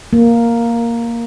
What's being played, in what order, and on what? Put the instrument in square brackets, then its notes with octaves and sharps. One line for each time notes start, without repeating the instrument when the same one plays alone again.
[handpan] A#3